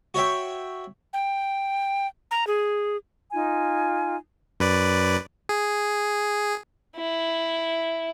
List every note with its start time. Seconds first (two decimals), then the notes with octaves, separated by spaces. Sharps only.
0.14 F#4 C#5 E5 G5
1.13 G5
2.31 A#5
2.47 G#4
3.31 D#4 F4 G#5
4.60 F#2 B4 D5
5.49 G#4
6.96 E4